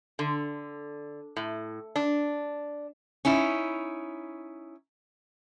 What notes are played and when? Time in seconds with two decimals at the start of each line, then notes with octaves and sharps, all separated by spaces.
0.19 D3
1.36 A2
1.96 D4
3.25 C#4 D#4 E4